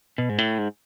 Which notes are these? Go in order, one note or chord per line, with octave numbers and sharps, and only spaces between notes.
B2
G#2
A2
G#2